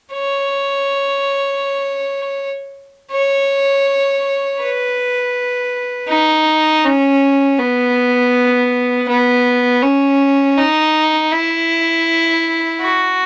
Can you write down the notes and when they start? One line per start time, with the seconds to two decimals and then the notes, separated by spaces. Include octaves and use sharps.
0.13 C#5
3.12 C#5
4.61 B4
6.09 D#4
6.84 C#4
7.59 B3
9.08 B3
9.83 C#4
10.57 D#4
11.32 E4
12.81 F#4